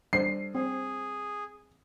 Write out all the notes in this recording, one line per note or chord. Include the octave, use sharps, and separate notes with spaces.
G3 D4 C5 C7
C4 G#4